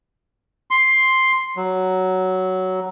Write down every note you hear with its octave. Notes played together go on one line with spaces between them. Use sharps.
C6
F#3